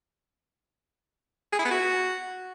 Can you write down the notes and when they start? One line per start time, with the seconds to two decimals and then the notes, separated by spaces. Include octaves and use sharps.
1.53 G#4
1.59 E4
1.65 B3
1.71 F#4